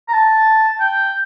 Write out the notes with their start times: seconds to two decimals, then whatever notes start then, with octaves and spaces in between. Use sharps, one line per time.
0.08 A#5
0.13 A5
0.80 G5